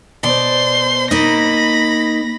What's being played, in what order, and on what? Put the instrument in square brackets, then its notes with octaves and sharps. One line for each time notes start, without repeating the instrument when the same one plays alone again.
[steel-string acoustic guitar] B2 D5 [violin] C5 C6
[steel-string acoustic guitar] A#3 D#4 [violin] B5 A#6